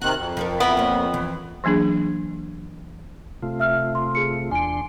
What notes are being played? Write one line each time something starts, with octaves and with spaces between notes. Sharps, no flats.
C3 D#3 F#4 F#6
F2
F3 A4 A#4
B3 E4 A#4 B4
A#3 C#4
E3
E3 F#3 A#3 D4 G#4
C3 A3 F4
E5 E6 F6
C6
G#4 C#7
E2 D4 G#5 C6 D7